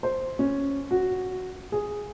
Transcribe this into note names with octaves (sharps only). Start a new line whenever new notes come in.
C5
C#4
F#4
G#4